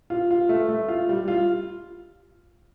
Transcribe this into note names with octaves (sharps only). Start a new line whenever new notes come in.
F4
F4
A3
A3
F4
G3
F4